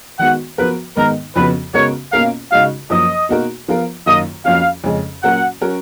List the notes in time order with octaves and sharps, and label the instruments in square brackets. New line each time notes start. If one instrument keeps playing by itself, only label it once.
[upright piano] D#3 G#3 B3 F#4 [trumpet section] F#5
[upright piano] F3 B3 F#4 A#4 [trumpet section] B4
[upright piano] G#2 D#3 G#3 B3 D#4 [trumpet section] A#4
[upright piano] F2 C#3 F3 B3 F#4 [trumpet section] B4
[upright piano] C#3 G#3 B3 F#4 A#4 [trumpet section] C#5
[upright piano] B2 A#3 C#4 F4 A#4 [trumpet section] F5
[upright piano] C#3 G#3 D#4 F#4 [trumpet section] F5
[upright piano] F#2 F3 A#3 [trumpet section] D#5
[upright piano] B2 A#3 D#4 F#4 A#4
F3 B3 F4 A#4
[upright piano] F#2 D#3 A#3 F4 [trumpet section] D#5
[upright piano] F2 F3 A#3 C#4 F#4 [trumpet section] F5
[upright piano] F2 C#3 G#3 C#4 G#4
[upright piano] A#2 F#3 C#4 F#4 A#4 [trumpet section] F#5
[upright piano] F#3 C#4 F#4 A#4